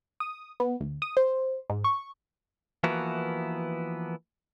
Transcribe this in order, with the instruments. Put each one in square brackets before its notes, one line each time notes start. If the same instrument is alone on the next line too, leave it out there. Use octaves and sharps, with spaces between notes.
[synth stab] D#6
B3
D2
D#6
C5
G#2
C#6
[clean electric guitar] E3 F3 A#3 B3 E4 F#4